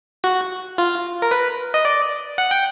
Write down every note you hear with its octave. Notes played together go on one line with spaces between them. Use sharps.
F#4
F4
A#4
B4
D#5
D5
F#5
G5